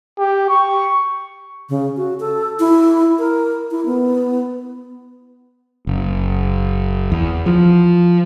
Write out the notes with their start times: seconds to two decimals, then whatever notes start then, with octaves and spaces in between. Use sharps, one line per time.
0.18 G4
0.49 C#6
1.69 C#3
1.97 F#4
2.20 A4
2.60 E4
3.19 A#4
3.71 E4
3.86 B3
5.87 F#1
7.12 E2
7.46 F3